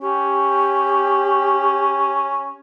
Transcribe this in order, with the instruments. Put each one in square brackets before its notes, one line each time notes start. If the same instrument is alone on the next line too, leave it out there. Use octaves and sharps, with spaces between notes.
[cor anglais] C#4 [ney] G4